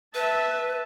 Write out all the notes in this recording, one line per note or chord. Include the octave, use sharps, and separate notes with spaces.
B4 E5 A5